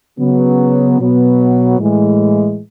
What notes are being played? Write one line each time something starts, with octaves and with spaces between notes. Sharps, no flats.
C#3 F#3 B3
B2 F#3 B3
A2 E3 G#3